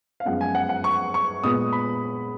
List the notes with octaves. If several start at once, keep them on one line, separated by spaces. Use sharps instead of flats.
F5
F#2 F3 G#3 B3 F#5
G#5
F#5
F#5
C#6
C#6
A#2 G#3 B3 D#6
B5